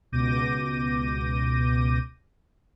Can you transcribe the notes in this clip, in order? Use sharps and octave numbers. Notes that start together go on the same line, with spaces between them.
C#2 B2 D6 G6 A#6 D#7